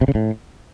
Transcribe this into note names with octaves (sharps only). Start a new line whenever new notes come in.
C3
C#3
A2